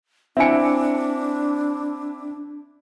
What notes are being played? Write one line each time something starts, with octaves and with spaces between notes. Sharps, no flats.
C4 D4 E4 E5 G#5 C#7